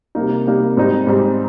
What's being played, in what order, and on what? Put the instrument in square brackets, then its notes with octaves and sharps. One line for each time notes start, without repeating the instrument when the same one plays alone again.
[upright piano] C3 G3 A#3 D#4
C3 G3 A#3 D#4
G#2 G3 C4 D#4
G#2 G3 C4 D#4